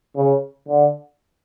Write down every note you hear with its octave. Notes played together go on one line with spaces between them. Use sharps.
C#3
D3